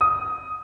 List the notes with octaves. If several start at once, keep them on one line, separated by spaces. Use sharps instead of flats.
D#6